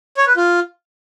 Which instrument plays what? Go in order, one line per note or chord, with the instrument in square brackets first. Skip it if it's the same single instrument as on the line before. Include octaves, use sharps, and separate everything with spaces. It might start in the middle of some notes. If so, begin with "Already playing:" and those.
[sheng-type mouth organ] C#5
B4
F4